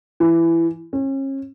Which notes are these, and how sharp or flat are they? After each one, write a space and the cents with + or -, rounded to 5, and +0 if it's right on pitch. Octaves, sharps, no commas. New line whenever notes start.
E3 +15
C#4 -35